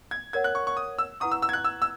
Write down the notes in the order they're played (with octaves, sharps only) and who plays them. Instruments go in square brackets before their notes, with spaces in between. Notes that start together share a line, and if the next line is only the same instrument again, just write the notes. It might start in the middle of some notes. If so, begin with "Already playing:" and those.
[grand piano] G#6
[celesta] A#4 C#5 F#5 [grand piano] G#6
[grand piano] F#6
C#6
C#6
D#6
E6
[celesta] E4 B4 F#5 A#5 C#6 [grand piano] D#6
[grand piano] E6
E6
G#6
F#6
E6
E6